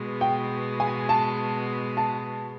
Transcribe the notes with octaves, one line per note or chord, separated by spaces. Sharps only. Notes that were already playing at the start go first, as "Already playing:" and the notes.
Already playing: B2 G#3 B3
G5
G#5
A5
A5